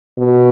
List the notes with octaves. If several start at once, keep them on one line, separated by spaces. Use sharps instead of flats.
B2